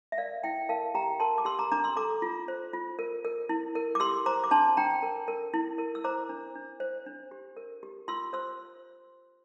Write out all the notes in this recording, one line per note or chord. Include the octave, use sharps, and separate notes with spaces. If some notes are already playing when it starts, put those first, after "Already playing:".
E5
A#4 D5 F5
E4 E5 G5
A#4 F5 A5
G4 G5 A#5
A#4 A5 C6
D6
G4 C6 E6
A#5 D6
D4 A#5 D6
C6 E6
A4 A#5 D6
F4
C5
F4
A#4
A#4
E4
A#4
D6
G4 C6 E6
C5 A#5 D6
D6
D4 A5 C6
D4 G5 A#5
A#4
A#4
E4
A#4
E6
C5 A#5 D6
D4
D4
C5
D4
G4
A#4
G4
F4 C6 E6
C5 C6 E6